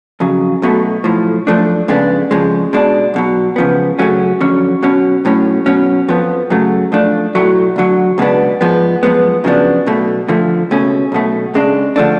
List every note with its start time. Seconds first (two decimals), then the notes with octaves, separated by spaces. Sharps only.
0.20 F2 C#3 F#3
0.62 B1 B2 F#3 A3
1.04 B1 A2 F3
1.47 F#2 F3 A3 D4
1.88 F2 C#3 G#3 B3 D4
2.31 F2 C#3 F3 G#3
2.73 B2 G#3 D4
3.14 B1 B2 F#3
3.56 C#2 C#3 F3 B3
3.99 F#2 C#3 F#3 A3 C#4
4.41 F2 D3 F#3 C#4
4.83 B2 F#3 C#4
5.25 B1 A2 F#3 C#4
5.66 B2 F#3 C#4
6.08 F2 F3 B3
6.50 F#2 C#3 F#3 A3
6.92 F2 F3 A3 D4
7.35 B1 A2 F#3 A3
7.76 D2 D3 F#3
8.18 C#2 B2 G#3 B3 D4
8.61 G#2 F3 G#3 B3
9.03 F#2 F3 G#3 B3
9.44 F#2 C#3 F3 B3 D4
9.86 B1 B2 A3
10.28 F2 D3 F3 A3
10.71 C#2 B2 A3 C#4
11.12 B1 B2 A3
11.54 C#2 C#3 G#3 D4
11.96 D3 F3 A3 D4